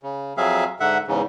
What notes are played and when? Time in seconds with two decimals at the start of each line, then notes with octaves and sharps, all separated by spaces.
0.03 C#3
0.37 F2 F#3 C4 G#4 E5 F5
0.80 G#2 D3 E5 F#5
1.07 E2 G#2 C#3